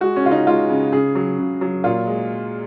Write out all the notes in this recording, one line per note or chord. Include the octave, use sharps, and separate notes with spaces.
G#3 F#4
C#4
C#3 F4
D#4
G#3 F4
C#3
C#3 G#4
F#3
C#3
F#3
A#2 F4
G#3